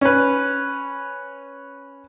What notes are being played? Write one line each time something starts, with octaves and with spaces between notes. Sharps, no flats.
C#4 B4